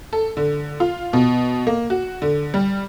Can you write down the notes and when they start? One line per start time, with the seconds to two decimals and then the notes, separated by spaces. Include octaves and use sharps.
0.13 A4
0.37 D3
0.80 F4
1.13 B2
1.67 A#3
1.90 F#4
2.22 D3
2.54 G3